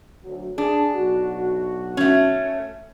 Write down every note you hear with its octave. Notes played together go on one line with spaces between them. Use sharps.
D2 F#3
D4 G#4
B1 F#4
A3 C#4